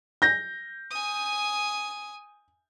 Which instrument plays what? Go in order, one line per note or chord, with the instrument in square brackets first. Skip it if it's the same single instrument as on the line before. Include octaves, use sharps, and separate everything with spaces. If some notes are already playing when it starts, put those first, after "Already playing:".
[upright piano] G6 A#6
[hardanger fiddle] G#5 D#6